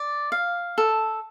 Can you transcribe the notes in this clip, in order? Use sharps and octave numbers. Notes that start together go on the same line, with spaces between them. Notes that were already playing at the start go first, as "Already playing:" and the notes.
Already playing: D5
F5
A4